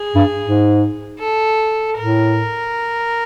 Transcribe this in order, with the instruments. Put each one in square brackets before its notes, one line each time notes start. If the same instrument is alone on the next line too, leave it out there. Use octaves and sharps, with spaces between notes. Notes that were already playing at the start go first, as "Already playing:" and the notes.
Already playing: [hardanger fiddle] G#4
[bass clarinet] G2
G#2
[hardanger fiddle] A4
[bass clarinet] A2 [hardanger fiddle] A#4